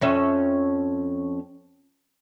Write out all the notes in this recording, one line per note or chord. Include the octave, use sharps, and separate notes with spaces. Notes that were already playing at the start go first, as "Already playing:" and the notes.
F2 C#4 E5